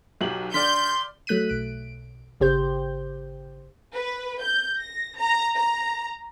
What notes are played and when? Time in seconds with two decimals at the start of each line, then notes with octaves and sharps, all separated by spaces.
0.21 B1 F#3 G4 F#7
0.54 D3 D5 C6 F6 G6 B6
1.27 F#3 A3 F#6 B6 D#7
1.49 B1 D7
2.40 G#1 C#3 G4 C5 G6
3.94 B4
4.41 G6
4.78 A#6
5.17 A#5
5.56 A#5